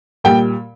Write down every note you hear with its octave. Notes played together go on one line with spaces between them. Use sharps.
A#2 G3 G5